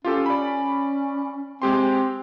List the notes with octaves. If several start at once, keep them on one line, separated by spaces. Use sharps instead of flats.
C#4 F4 G4 A4
D5 B5
G#3 C4 G4 C6